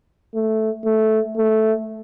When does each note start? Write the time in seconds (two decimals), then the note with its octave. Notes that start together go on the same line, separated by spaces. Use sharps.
0.35 A3
0.85 A3
1.37 A3